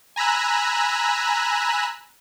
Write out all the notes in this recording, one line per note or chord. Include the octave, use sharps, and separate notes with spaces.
G#5 A#5 B5 E6 F#6